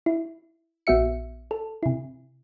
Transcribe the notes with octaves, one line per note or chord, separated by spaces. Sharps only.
E4
A#1 B3 F#4 E5 C#7
A4
C3 E4